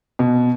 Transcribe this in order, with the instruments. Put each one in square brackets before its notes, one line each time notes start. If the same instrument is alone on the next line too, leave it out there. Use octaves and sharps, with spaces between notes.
[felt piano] B2